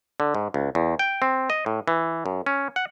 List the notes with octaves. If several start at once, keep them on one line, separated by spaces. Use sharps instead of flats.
D3
G#2
C#2
E2
G5
C4
D#5
A2
E3
F#2
C#4
F#5